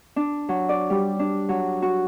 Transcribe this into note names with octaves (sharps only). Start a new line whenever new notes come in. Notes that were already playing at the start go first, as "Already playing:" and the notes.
D4
F#3
D5
G3
D4
F#3
F#4